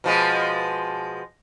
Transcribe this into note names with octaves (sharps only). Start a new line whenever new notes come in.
B2 F3 G#3